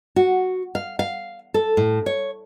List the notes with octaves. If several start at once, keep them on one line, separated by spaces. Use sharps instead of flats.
F#4
F5
F5
A4
A2
C#5